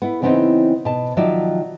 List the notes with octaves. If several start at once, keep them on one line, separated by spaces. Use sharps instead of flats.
B3 E4
C#3 E3 B3 C4 D4 D#4
B2 A5
D#3 F3 F#3 D5 E5